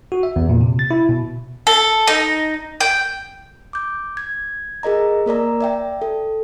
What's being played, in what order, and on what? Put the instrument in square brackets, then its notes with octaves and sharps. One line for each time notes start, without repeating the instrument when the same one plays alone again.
[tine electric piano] F#4
E5
E2
A#2
C3
A6
E4
B2
[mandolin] A4
D#4
G5
[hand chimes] D6 G6
G#6
G#4 A#4 D#5 A#5
A#3 A#4 D5 A#5
D5 E5 G5
A4